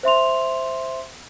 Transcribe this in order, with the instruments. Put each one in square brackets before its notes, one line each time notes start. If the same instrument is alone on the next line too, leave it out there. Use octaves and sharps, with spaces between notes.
[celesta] C5 E5 C6 F7